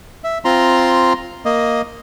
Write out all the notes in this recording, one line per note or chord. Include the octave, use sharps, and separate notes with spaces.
E5
C4 F4 A#5 C6
A#3 D#5